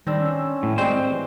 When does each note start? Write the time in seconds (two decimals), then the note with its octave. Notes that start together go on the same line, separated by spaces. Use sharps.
0.07 D#3 G3 C4 D4 E6
0.20 C#4
0.63 A2
0.78 G3 G#3 C4 F#4 C5 G5
1.07 E3